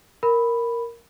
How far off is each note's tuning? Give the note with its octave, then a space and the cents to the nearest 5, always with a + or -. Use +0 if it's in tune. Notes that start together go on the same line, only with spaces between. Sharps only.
A#4 +0 B5 +0